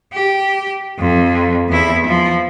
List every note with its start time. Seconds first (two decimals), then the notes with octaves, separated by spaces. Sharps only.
0.13 G4
0.98 F2
1.69 E2 E4
2.06 F3